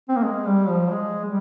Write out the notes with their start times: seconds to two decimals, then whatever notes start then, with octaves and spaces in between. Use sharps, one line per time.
0.09 C4
0.16 A#3
0.23 G#3
0.46 G3
0.69 F3
0.91 G#3
1.25 G3